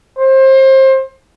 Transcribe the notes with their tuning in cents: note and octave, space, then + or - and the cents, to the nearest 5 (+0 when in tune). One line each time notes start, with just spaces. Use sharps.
C5 +25